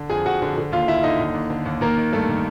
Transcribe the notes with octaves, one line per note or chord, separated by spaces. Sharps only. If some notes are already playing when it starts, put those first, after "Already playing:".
Already playing: D3
F2 G#4 G#5
F2 F#4 F#5
D3
D3
D#2 F4 F5
D#2 E4 E5
D3 D#4 D#5
D#2
D#2
D3
D#2
D#3 A#3 A#4
D#3
G2 A3 A4
D#3